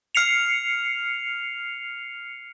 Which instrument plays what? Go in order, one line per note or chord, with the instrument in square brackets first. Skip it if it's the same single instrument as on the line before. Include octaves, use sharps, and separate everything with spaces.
[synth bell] F6 C7 C#7 F7